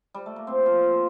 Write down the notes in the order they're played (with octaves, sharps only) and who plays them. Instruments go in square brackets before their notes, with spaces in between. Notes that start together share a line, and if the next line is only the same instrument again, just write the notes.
[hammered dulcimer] G3
A3
A#3
A#2 C4
F3 F4
A#2